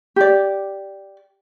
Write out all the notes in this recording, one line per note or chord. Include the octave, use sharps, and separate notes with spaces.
G4 D5